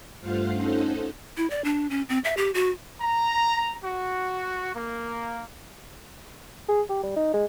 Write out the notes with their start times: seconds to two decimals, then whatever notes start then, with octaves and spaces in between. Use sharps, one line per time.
0.20 G2 A3 F4 C5 F5 F#5
0.53 C#4 D#4 A4 C5 F#5
1.37 E4
1.50 D5
1.64 D4
1.90 C#4
2.09 C4
2.24 E5
2.37 G4
2.54 F#4
3.00 A#5
3.83 F#4
4.74 A#3
6.69 G#4
6.90 G4
7.03 G3
7.17 D#4
7.34 G#3